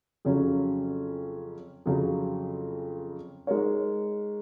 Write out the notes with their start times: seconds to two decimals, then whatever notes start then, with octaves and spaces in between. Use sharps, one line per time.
0.25 F2 C#3 F#3 C#4
1.86 F2 C#3 F#3
3.47 G#3 D#4 A#4 C#5